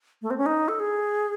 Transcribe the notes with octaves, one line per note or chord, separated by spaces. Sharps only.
A3
C4
C#4
D#4
A4
G#4